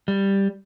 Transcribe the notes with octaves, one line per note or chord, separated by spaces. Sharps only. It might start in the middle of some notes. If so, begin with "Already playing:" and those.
G3